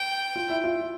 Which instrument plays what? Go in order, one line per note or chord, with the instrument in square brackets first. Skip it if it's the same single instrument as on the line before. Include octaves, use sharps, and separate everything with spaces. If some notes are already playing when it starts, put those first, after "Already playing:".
Already playing: [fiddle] G5
[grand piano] F4
E4
F4